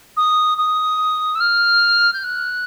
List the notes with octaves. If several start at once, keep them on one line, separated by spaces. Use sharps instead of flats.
D#6
D#6
E6
F6
G6
F#6